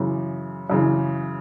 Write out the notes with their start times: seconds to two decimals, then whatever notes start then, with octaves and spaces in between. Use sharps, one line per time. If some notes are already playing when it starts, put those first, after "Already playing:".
Already playing: F#2 C#3 E3
0.70 F#2 C#3 E3